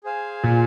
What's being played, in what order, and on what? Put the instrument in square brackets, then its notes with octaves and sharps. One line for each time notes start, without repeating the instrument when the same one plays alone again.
[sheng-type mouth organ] G#4 C5 F5 G#5
[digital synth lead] A#2